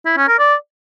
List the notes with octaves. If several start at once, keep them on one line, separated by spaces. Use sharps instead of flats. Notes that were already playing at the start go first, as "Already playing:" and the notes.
E4
C#4
A#4
D5